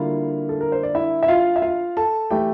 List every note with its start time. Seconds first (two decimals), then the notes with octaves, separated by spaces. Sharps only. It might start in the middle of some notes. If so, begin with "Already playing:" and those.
Already playing: D3 G3 A#3 E4 F4 F5
0.49 A4
0.61 A#4
0.72 C5
0.83 D5
0.95 E4 E5
1.23 E5
1.28 F4 F5
1.56 E5
1.62 F4 F5
1.97 A4 A5
2.31 E3 A3 E4 G4 G5